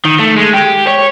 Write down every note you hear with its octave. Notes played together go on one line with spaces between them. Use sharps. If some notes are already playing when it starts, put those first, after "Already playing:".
D#3
A3
G#3
G4
C#5